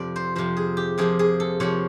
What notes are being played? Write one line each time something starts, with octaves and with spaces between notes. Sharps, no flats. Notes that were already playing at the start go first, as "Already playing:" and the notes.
Already playing: F2 C3 F3 D5
C5
F2 C3 F3 C5
G#4
G4
C3 F3 A#3 G#4
G#4
A4
C3 F3 A#3 C#5